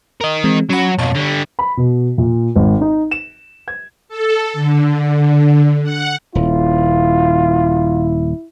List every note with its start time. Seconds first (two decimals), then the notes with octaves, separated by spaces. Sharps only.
0.21 A#4 D#5
0.44 E3 G#3 C4
0.69 F#3 C#4 F#4 B5
0.98 B1 F2 C#5 A5 C#6
1.15 D3 G3
1.59 B5
1.77 B2
2.18 A#2
2.56 G#1
2.81 D#4
3.11 E7
3.68 G#6
4.08 A4
4.53 D3
5.83 F#5
6.35 D#1 E4 F4